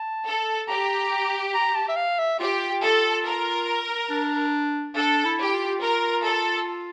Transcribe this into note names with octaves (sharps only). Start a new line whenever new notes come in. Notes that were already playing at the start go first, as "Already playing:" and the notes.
Already playing: A5
A4
G4 A#5
A#5
A5
E5
F5
E5
F4 G4
A4
A#4
D4
D4 A4
E4
G4
F4
A#4
A4